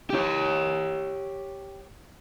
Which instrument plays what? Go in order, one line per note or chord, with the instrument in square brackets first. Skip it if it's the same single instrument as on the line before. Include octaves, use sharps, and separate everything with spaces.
[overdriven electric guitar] G4 C#5